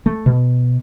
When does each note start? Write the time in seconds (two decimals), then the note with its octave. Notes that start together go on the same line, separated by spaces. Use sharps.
0.06 A3
0.26 B2